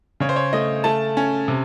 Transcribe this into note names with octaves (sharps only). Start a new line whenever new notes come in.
C#3 C#5
C5
C#5
A3 D#5
A3 A5
C#4
C3